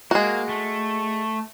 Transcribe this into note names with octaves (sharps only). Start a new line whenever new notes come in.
G#3 A#3 F#4
A3